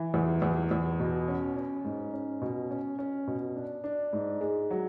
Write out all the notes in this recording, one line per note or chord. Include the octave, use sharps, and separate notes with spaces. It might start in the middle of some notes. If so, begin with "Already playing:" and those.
Already playing: E3
E2
E2
E2
B2
C#4
C#4
G#2
C#4
B2
C#4
C#4
B2
D4
D4
G#2
G#3
F#3